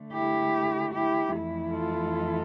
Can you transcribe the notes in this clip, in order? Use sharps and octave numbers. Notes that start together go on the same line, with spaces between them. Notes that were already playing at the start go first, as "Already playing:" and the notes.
Already playing: D3 A3
E4 G4
E4 G4
F2 E3 A3 E4
F4 A4